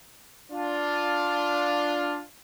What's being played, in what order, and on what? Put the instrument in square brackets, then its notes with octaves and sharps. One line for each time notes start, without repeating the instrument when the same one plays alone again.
[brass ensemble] D4 F4